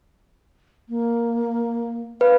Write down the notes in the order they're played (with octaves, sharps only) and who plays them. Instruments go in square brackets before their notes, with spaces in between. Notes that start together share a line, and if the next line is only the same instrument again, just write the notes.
[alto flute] A#3
[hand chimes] B4 [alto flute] F5